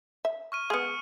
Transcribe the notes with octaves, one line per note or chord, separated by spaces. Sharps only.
E5
C#6 F6 D#7
G#3 B3 D#6 F6 C#7